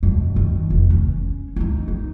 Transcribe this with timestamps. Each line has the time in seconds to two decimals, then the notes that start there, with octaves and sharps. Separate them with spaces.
0.03 F#2 B2
0.36 D#3
0.70 F1
0.90 C#4
1.56 D#4 E4
1.88 D#4